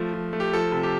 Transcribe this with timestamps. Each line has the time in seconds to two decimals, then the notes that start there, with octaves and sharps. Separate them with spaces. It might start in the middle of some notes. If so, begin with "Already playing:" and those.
Already playing: F3 A3
0.14 F3
0.33 A3
0.40 G4
0.53 F3 A4
0.72 C3
0.83 G4